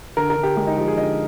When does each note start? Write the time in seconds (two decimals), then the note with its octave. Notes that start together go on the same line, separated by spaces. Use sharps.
0.17 D3 A#4
0.30 A#4
0.36 D3
0.43 G4
0.57 G#3 G4
0.67 D#4
0.77 F3 G4
0.88 G#4
0.97 D3 D#5